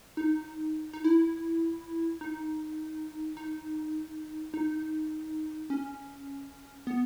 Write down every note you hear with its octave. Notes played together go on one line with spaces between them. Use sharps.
D#4
D#4
E4
D#4
D#4
D#4
C#4
B3